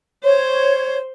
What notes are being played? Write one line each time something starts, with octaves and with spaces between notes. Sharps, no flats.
C5 C#5